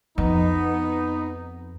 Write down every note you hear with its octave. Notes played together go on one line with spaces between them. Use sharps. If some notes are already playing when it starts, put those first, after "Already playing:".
F2 B3 D#4